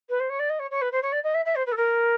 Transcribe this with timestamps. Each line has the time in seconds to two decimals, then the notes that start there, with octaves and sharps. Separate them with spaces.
0.10 B4
0.20 C5
0.30 C#5
0.39 D5
0.50 D#5
0.59 C#5
0.71 C#5
0.82 B4
0.92 C5
1.03 C#5
1.12 D5
1.24 D#5
1.34 E5
1.45 E5
1.56 C5
1.66 B4
1.72 A4
1.77 A#4